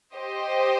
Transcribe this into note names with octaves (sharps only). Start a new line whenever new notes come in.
G4 C5 D#5